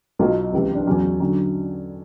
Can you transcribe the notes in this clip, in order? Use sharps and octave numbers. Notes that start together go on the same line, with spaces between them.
B1 B2 F#3 F4
C#2 C3 E3
D4
E2 C#3 F#3 C#4
D3 F#3